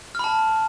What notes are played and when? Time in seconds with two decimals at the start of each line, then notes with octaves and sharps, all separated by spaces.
0.15 F6
0.19 B5
0.24 A5